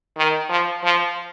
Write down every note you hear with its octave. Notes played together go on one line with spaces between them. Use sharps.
D#3
F3
F3